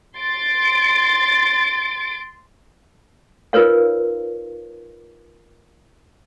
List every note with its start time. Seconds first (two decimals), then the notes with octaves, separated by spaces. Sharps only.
0.18 C6 A6 D7
3.53 D#4 F4 A#4 B4 C#5 F5